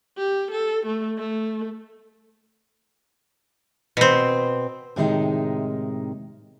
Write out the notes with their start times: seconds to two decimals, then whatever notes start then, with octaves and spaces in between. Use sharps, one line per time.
0.17 G4
0.51 A4
0.86 A3
1.17 A3
3.97 B2 C4
4.96 A2 C3 D#3 G#3 C#4 D#4